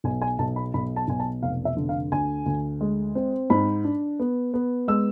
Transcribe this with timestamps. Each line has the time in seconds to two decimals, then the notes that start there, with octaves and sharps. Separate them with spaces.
0.04 B1 G#5
0.22 G#5
0.39 B1 A5
0.56 B5
0.74 B1 B5
0.96 A5
1.08 B1 G#5
1.20 A5
1.42 F1 F5
1.65 E5
1.77 D3
1.89 F5
2.12 D2 G#5
2.46 D2
2.81 G#3
3.15 C4
3.50 G#2 B5
3.84 D4
4.19 B3
4.54 B3
4.88 G#3 E6